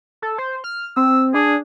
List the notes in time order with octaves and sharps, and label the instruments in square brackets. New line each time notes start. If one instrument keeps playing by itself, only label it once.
[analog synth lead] A4
C5
F6
[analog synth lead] C4 [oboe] E6
[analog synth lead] D4 [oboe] G#4